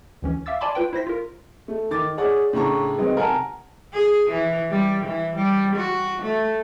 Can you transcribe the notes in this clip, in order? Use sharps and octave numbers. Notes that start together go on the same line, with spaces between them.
D2 E3 C#4
E5 F5 D6 E6 A6
D5 G#5 A5 B5 C6 D6
F4 B4 G5
E4 C5 A#6 B6
F4 A#4
A3
D#3 D6 A6
G#4 C#5 D5 F#5
A2 C#3 D4 A#5 C#6
D#3 F#3 G#3 B3 C4 D#4
C3 A#4 F#5 G#5 A5
G#4
E3
G3
E3
G3
F#4
A3